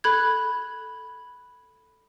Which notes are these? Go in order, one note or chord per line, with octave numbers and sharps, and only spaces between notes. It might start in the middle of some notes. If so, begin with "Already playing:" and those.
A4 B5 F#6 G#6